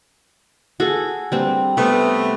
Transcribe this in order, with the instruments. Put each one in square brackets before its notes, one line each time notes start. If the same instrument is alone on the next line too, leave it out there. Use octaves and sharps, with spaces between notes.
[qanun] F#4 G#4 A4
G3 C4 D4
[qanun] C3 [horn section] A3 B3